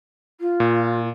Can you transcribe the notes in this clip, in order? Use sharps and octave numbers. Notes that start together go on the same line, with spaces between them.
F4
A#2